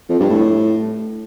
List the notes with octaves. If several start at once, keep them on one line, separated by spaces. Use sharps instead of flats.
F2
G2
A2